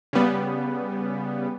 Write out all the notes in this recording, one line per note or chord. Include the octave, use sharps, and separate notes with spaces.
C#3 G3 B3